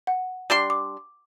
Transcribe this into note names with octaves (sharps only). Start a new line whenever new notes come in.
F#5
G3 D4 C6
D6